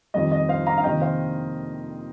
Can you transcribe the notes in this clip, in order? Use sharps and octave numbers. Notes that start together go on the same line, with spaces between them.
F2 D#3 G3 D#5
D#5
C5 F5
F5 A#5
F5
F2 C3 D#3 A#3 D#5 G5
C5 F5